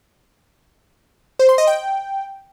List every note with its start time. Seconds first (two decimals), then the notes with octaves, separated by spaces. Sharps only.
1.39 C5
1.49 C6
1.58 D#5
1.67 G5